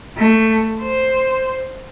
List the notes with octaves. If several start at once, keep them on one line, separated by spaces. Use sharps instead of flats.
A3
C5